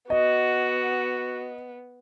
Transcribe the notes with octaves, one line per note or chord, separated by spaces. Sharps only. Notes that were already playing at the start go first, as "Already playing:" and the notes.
B3 F#4 D#5